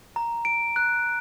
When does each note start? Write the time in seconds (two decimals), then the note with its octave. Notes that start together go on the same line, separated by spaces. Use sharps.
0.16 A#5
0.45 D7
0.76 F#6